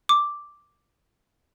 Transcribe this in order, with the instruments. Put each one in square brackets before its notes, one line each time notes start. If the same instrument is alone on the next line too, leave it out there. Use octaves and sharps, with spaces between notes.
[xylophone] D6